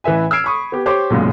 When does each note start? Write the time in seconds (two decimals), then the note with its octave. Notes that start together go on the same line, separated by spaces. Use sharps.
0.04 A1 E3 B4 E5 G#5
0.31 E6 F6 G#6 C7 D7
0.44 B5 C#6 D#6
0.72 B3 G4
0.86 G4 C5 C#5 C6 D6
1.10 B1 F#2 A#2 C#3 G#3